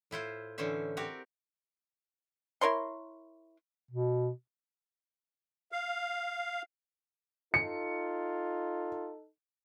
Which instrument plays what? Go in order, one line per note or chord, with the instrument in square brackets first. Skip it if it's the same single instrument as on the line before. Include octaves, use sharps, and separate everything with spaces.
[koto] A2 E4 F4 C5
A2 D3 E3 C#4 C5 E5
C4 F#4 G4 A#4
[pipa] E4 A#4 C#5 C6
[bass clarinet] B2
[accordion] F5
[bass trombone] D#4 [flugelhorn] F4 [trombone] A4 [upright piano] C#7